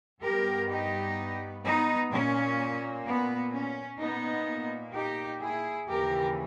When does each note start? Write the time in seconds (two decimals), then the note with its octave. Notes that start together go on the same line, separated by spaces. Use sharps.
0.22 G2 G3 B3 G4 A#4
0.69 D#4 G4
1.63 B3 D#4
2.11 A#2 A#3 C#4
3.05 B3
3.53 C#4
3.99 A#2 A#3 B3 D#4
4.94 D#4 G4
5.41 E4 G#4
5.89 D#2 C#3 E3 G4 A#4